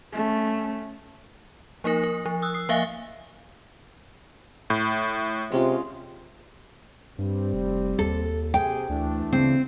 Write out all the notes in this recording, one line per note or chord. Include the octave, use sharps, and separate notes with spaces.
A3 C#4
F3 A#3 D#4 A#4 A#6
A#4
F3
D#6 E6 F#6
D#6 C7
F3 A#3 E5 F5 G#5
A2
C3 G#3 C#4 F4
G2 G3 C4
F1
D#2 A4
C3 G#4 G5
D2 E3 A3 D4
C#3 C4